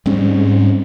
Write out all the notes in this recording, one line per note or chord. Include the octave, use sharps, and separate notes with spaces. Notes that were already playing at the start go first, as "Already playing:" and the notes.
G#2 G3 C4 C#4